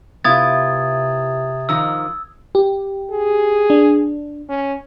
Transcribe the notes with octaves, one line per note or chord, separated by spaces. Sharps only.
C3 B3 E4 F4 D#6 G#6 A6
D#3 F3 D#4 E6
G4
G#4
D4
C#4